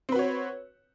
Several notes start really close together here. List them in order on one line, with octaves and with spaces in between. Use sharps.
C4 B4 F#4 C#5